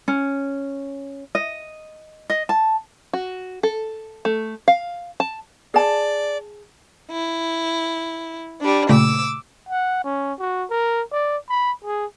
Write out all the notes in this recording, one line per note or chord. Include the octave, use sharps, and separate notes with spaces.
C#4
D#5
D#5
A5
F#4
A4
A3
F5
A5
G#4 D5 A5
E4
G3 D4
A#2 C#3 A3 D6 E6
F#5
C#4
F#4
A#4
D5
B5
G#4